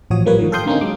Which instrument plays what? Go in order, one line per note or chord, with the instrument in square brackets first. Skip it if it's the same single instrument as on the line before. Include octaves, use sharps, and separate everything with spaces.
[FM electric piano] A1 F3 F#4 C#5 D#6
F3 G3 A#3 A#4 B4 C#5
G#2 D#3 F3
A4 F5 G5 C6 D#6 G6
D3 A#3 C4 C#4 D#4
F#3 G#3 D6